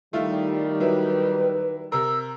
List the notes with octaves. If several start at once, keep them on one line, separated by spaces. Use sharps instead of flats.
D#3 G3 A3 E4 F4
F#3 E4 B4
C3 A#4 E6